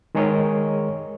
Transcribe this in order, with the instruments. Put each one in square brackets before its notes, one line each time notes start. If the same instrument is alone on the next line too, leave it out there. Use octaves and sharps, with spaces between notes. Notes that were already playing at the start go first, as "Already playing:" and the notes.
[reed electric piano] D#3 G#3 G#4 A#4 C#5 D#5